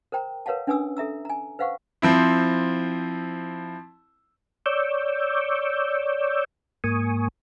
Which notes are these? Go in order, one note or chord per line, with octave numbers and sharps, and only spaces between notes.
A#4 C5 G5 A#5
A#4 B4 C#5 F5 F#5 A5
C#4 D4 B4 G#5 D#6 E6
A4 E5 A#5 E6
G#5 A#5
B4 C5 F5 F#5 C#6
F3 C4 E4
C#5 D5 C#6 D6 E6 G6
G#2 A#3 G#5 C#6 D#6